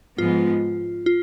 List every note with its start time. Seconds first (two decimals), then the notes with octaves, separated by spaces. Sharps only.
0.18 G#2 F3 G#3 B3 F4
1.06 F4